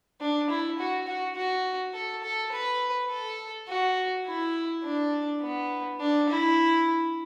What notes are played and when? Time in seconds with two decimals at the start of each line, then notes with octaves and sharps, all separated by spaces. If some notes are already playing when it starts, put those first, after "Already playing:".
0.21 D4
0.49 E4
0.79 F#4
1.07 F#4
1.36 F#4
1.94 A4
2.23 A4
2.52 B4
3.09 A4
3.68 F#4
4.26 E4
4.84 D4
5.42 B3
6.00 D4
6.29 E4